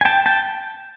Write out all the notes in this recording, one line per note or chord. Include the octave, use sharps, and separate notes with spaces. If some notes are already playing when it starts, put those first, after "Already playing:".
G#5
G5 A5
G5 A5